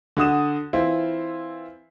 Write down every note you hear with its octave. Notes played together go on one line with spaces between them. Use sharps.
D3 F#4 D#6 E7
E3 C4 E4 F4